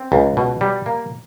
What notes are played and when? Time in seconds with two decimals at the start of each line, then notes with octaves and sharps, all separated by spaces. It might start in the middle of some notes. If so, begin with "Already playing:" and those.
Already playing: C4
0.12 C#2
0.37 B2
0.61 G3
0.86 A#3